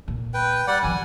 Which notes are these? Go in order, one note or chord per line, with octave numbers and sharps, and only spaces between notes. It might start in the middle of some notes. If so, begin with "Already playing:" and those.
A#2
B4 G5
G3 D5 F#5
D#3 F3 G#5